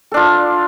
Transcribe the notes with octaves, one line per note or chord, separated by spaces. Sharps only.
D4 F4 A4